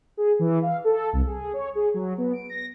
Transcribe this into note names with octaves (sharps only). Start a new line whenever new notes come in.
G#4
E3
F5
A4
C2
G#4
C#5
G#4
F#3
B3
D7
A#6